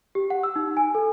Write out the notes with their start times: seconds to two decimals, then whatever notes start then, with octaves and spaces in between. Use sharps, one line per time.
0.15 G4
0.30 F#5
0.43 E6
0.56 D#4
0.77 G#5
0.95 A4